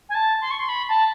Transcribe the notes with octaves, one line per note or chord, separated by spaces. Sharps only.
G#5
A5
C6
C#6
C6
B5
A5